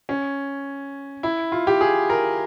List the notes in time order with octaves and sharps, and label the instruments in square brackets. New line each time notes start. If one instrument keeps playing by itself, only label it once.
[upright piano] C#4
E4
F4
G4
G#4
A#4